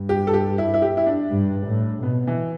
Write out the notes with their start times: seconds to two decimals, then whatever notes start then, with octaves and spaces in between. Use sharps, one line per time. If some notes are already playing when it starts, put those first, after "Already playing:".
Already playing: G2
0.09 G4
0.27 A4
0.34 G4
0.58 E4
0.74 E4
0.82 G4
0.97 E4
1.06 D4
1.30 G2
1.67 A2
2.02 B2 B3
2.27 E3